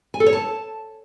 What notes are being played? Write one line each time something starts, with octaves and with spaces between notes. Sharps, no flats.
G#5
A4
C#5
A5